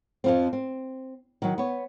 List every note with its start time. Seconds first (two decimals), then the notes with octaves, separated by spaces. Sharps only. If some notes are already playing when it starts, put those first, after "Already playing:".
0.24 F2 F3 C4
0.53 C4
1.42 D#3 F#3
1.58 B3 C#5